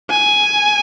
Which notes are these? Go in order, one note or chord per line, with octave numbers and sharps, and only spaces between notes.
G#5